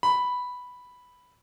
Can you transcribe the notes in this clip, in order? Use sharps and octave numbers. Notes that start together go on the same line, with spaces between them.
B5